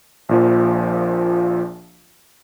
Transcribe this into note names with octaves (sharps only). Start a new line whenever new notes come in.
A#1 A#2 F3